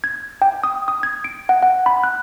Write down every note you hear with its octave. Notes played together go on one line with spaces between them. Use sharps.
G#6
G5
D#6
D#6
G#6
D7
F#5
F#5
B5
F#6